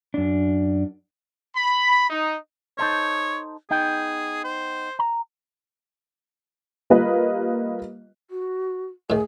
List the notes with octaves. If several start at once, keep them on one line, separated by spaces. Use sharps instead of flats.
F#2 D4
B5
D#4
D#4 A4 C5 C#5
B3 D#4 G#4 G5
C5
A#5
G3 A#3 F4 B4 D#5
F#4
A2 D#3 G#4